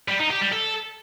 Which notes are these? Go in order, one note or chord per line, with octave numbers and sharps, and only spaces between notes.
G3
D#4
G4
G3
A4